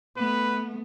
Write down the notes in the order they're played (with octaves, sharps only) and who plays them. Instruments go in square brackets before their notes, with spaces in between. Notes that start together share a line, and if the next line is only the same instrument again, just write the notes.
[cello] A3 B3 [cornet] B4